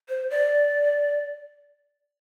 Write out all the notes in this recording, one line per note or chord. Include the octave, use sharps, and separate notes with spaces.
C5
D5